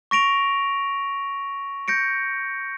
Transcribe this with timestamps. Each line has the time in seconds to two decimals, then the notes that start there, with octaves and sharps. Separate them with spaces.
0.11 C#6 A#6 D7 F7
1.88 G6 A#6 C#7 D7